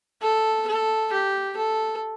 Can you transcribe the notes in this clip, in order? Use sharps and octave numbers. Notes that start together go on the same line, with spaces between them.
A4
A4
G4
A4